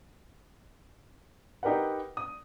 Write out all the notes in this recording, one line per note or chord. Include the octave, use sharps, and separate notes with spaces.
D#4 G4 A#4 B4 F#5
D#6